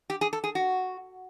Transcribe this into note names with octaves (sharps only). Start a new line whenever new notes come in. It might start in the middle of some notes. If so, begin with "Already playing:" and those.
G4
G#4
A4
G#4
F#4